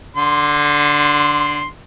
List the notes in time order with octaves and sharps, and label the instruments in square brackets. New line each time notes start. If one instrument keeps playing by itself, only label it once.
[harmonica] D3 C6